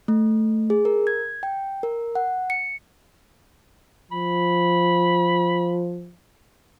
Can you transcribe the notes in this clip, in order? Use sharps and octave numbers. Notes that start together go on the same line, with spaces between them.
A3
G#4
A#4
G#6
G5
A#4
F#5
C#7
F3 B5